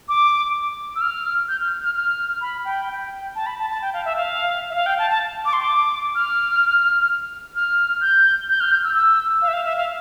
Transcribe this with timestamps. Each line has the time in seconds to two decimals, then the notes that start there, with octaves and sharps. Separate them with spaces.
0.09 D6
0.96 E6
1.01 F6
1.49 G6
1.61 F6
1.83 F6
1.95 F6
2.41 B5
2.65 G5
2.89 G5
3.35 A5
3.46 B5
3.59 A5
3.70 A5
3.82 G5
3.94 F5
4.05 E5
4.17 F5
4.70 E5
4.75 F5
4.86 G5
4.99 A5
5.10 A5
5.45 D6
5.53 C6
5.62 D6
6.15 F6
7.56 F6
8.01 G6
8.49 G6
8.60 F6
8.72 G6
8.84 E6
8.95 E6
9.42 F5
9.48 E5
9.53 F5
9.65 E5
9.77 F5